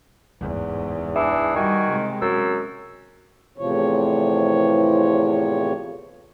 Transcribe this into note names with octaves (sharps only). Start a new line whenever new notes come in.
D1 E2 G#2 C#3
E3 D4 E4 G#4
D#3 G3 F#4 G#5
C3 G#3
F#2 C#4 E6
E2 A2 C3 F3 C#5